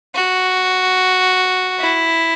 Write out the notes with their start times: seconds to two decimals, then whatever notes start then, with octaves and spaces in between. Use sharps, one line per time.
0.15 F#4
1.80 E4